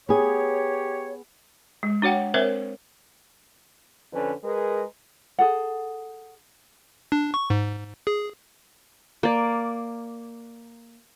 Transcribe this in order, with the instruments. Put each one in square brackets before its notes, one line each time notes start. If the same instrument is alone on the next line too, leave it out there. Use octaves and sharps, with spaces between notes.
[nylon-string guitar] B3 G#4 [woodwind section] G4 C#5
[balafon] G#3
D4 F#4 C#5 F#5 G5
C4 A#4 C5 C#5 E5
[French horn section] F2 D3 C#4 B4
G#3 G#4 A#4 B4
[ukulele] G#4 A4 F#5
[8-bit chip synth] D4
C#6
G#2
G#4
[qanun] A#3 D5